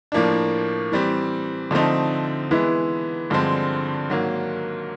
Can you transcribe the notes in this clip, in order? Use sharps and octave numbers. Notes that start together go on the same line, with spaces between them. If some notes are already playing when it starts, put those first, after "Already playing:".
A2 F3 A#3 D4
E3 G3 C4
D3 F3 A3 C4 D#4
E3 G#3 B3 E4
G2 D3 F3 G#3 C4
G#2 D#3 F#3 A#3